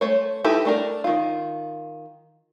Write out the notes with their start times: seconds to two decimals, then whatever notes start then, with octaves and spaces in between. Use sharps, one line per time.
0.01 A3 C5 C#5
0.44 D#4 E4 G4 A4 B4
0.65 A3 D4 A#4
1.04 D#3 F4